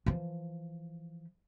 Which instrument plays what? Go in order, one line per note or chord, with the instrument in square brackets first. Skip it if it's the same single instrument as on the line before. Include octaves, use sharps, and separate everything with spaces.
[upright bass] E3 F3